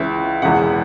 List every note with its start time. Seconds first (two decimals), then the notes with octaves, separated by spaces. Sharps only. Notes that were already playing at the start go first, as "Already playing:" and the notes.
Already playing: C#2 C#3 E3 E5
0.42 E1 E2 C#3 E3 F#5